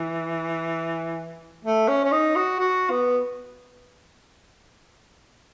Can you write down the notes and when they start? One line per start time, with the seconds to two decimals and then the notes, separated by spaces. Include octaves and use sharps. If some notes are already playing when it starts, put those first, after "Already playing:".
Already playing: E3
1.65 A3
1.88 C#4
2.04 C#4
2.12 D#4
2.36 F#4
2.59 F#4
2.90 B3